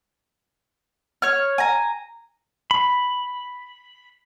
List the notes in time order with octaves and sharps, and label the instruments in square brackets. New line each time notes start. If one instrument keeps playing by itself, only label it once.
[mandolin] C#5 F6
G#5 A#5
[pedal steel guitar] B5